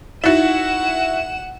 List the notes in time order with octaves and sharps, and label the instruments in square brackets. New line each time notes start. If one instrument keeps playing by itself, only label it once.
[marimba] D#4 A5 A6 [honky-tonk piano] E4 F#4 [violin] F#5 E7